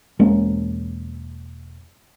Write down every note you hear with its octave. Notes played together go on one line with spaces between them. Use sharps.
E1 G#3 A#3 C#4